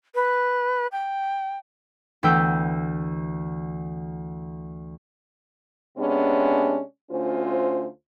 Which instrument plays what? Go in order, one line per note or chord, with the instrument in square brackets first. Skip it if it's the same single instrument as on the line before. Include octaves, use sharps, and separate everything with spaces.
[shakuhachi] B4
G5
[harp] D2 E3 B3 G5 E6 G6
[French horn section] C3 G#3 B3 C#4 D4
D2 C#4 F4 C5